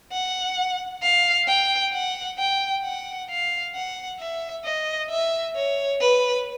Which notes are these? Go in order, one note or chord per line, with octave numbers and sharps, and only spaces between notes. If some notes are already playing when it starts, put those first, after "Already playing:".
F#5
F5
G5
F#5
G5
F#5
F5
F#5
E5
D#5
E5
C#5
B4